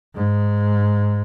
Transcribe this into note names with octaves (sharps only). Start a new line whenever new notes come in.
G#2